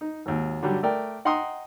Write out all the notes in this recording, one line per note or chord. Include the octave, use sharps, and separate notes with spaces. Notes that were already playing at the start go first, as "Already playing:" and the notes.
D#4
G#1 D#2
D3 F#3 G3
A3 A#4 D5 G5
D#5 F#5 G5 A#5 C6 D#6